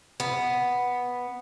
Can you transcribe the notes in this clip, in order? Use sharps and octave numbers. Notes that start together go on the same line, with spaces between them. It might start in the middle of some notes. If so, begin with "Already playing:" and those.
B3